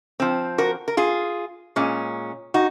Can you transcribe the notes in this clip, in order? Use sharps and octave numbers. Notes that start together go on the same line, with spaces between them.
F3 C4
F#4 A#4
A#4
F4 G#4
A#2 G#3 C#4
D#4 F#4